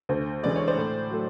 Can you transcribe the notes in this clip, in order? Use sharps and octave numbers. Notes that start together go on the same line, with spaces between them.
D2 C5
C3 E3 G#3 B3 D5
C#5
C5 D5
A2
F#3 A3